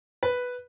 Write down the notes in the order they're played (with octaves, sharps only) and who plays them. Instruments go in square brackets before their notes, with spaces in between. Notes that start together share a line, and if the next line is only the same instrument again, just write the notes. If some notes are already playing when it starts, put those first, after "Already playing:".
[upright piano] B4